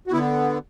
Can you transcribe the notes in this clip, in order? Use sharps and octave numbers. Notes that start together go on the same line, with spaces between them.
F#4
D3 B3 E4